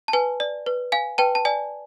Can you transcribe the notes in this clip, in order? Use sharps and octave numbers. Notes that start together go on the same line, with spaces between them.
A5
B4 G#5
D5
B4
F5 G#5
B4 G5 A5
A5
D5 G#5